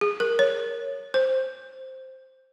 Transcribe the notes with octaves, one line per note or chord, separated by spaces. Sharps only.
G#4
A#4
C#5
C5